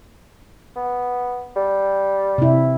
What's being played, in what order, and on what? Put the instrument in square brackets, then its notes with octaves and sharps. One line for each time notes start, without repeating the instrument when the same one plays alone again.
[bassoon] B3
G3
[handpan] C3 E4